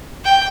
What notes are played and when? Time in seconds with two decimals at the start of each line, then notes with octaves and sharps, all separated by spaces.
0.25 G5